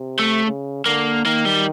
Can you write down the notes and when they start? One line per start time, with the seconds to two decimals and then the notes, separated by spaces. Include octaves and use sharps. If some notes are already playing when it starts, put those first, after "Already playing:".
Already playing: C3
0.19 A3
0.46 C#3
0.86 D3 A#3
1.25 D#3 A#3
1.45 G3